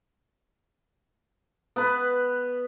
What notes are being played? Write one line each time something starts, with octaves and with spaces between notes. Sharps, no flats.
B3 B4